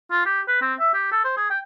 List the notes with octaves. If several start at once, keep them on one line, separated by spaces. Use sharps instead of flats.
F4
G4
B4
C4
E5
G4
A4
C5
G#4
G5